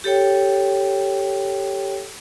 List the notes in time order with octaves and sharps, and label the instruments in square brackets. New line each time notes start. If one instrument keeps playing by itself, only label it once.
[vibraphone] G4 A4 C#5 G5